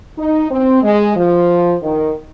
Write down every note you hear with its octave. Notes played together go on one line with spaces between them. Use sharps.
D#4
C4
G#3
F3
D#3